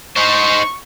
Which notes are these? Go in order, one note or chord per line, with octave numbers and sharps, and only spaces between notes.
D#4 C5 C#6